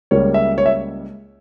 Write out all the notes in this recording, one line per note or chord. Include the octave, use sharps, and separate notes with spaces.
C#2 C#3 G3 A#3 C#5
E5
C#5
E5